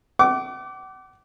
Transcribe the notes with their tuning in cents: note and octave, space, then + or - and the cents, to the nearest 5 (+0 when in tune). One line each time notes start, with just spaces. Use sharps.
F#5 +40 D6 -10